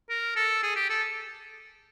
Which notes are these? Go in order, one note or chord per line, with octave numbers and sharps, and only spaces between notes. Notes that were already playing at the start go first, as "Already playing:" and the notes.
A#4
A4
G#4
G4
A4